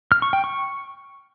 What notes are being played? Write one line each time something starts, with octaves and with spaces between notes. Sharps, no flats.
F6
C#6
G5
C#6